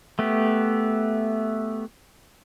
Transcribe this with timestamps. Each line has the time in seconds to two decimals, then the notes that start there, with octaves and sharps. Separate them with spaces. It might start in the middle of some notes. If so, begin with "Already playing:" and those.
0.19 A3 B3 G4